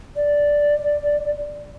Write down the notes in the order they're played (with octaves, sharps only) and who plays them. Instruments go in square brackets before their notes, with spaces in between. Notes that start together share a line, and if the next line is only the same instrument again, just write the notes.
[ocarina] D5